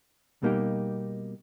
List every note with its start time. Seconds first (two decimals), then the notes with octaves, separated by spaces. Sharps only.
0.43 B2 G3 A#3 D#4 G4